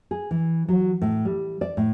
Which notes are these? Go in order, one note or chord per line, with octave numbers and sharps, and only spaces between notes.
G#4
E3
F#3
A2
G3
D5
A2